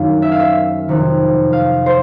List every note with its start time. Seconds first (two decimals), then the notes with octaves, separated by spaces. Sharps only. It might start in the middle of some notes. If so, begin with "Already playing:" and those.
Already playing: F#2 D#3 F5
0.22 E5
0.32 F5
0.40 E5
0.88 F2 C3 D#3
1.53 F5
1.86 C5